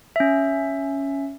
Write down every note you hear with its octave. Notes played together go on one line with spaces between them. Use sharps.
C#4 E5